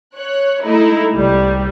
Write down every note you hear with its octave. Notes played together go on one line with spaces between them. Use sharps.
C#5 F#6
G#3 A3 D#4 E4
C2 C3 G3